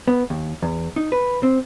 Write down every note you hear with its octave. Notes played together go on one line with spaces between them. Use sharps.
B3
D#2
E2
D#4
B4
C4